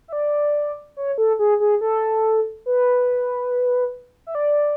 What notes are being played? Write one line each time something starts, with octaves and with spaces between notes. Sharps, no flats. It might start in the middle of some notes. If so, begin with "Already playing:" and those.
E5
D5
C#5
A4
G#4
G#4
A4
B4
E5
D5